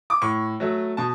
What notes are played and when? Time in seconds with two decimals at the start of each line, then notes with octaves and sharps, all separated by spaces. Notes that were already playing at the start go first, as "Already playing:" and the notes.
0.10 D6
0.22 A2 C#6
0.60 F#3 A3
0.97 B2 A5